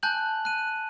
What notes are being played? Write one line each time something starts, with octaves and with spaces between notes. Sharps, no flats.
G#5 A5 F#6 G6 F#7
F#6 D#7